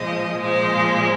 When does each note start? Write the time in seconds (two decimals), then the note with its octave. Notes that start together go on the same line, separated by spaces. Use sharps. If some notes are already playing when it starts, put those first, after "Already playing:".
Already playing: A#2 F3 G#3 D#5
0.40 A#2 F3 G#3 C5